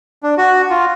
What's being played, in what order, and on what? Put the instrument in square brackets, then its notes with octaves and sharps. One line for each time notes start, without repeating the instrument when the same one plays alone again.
[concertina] D4
F#4
F4